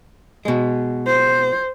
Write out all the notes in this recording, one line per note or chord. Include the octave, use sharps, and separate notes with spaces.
B2 G#3
C5